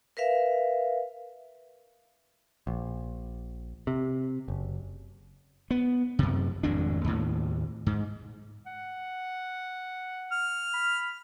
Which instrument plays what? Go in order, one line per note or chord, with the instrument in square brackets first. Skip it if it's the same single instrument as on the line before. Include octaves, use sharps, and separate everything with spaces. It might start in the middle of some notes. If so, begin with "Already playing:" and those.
[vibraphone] A#4 B4 E5 F5
[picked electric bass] A#1
C3
F#1
[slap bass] B3
F#2 C3
G#1 F2 A2 D4
D#2 A2
G#2
[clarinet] F#5
[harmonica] F6
[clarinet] B5